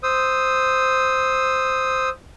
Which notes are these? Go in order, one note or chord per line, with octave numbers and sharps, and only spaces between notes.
C5 D#6 E6